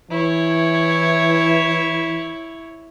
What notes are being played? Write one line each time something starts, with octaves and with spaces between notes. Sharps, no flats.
E3 E4 C#5